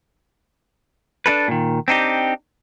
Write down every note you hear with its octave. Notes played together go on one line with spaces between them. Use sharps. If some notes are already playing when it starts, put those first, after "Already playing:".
D4 D#4 A4 B4
A#2 D#3
C4 D4 D#4 G4